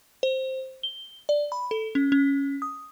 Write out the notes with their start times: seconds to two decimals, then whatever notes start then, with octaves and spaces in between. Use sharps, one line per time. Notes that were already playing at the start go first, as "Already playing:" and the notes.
0.23 C5
0.83 G7
1.29 D5
1.52 B5
1.71 A4
1.95 C#4
2.12 C#4
2.62 D#6